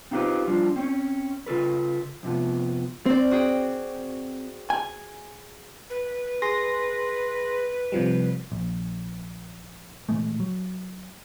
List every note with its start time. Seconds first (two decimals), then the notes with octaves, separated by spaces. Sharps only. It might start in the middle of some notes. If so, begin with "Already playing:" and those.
0.11 C4 D#4 F4 G4 B4 C5
0.47 F3 G3 D4 F4
0.76 C4 C#4 C#5
1.46 C#3 F4 A4 B4
2.23 F2 C3 F3 B3
3.06 C4 C5 D5
3.31 F#4 G#4 G5
4.70 G#5
5.90 B4
6.42 G#4 C6 A#6
7.92 C3 F3 G3
8.52 A#1
10.09 A#2 E3 G#3 A3
10.40 F#3